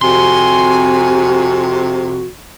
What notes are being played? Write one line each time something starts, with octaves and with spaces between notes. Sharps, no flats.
F2 C3 F#4 G#5 C6